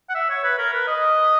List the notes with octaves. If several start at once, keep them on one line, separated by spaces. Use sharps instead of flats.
F#5
E5
C#5
B4
A#4
B4
D#5